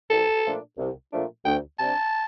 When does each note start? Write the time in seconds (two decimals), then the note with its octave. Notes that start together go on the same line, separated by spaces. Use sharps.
0.10 C2 A4
0.44 A#2 F3 A3 D4
0.78 C2
1.11 A#2 F3 A3 D4
1.45 D2 G5
1.79 C3 G3 D4 A5